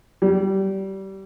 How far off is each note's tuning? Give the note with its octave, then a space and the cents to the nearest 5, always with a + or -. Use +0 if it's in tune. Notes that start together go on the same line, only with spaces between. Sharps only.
G3 -25